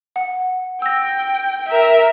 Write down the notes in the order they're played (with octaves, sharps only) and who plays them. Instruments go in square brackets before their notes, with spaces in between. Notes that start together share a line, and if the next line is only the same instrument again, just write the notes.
[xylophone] F#5
[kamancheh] G5 [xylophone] E6 A#6
[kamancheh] A#4 E5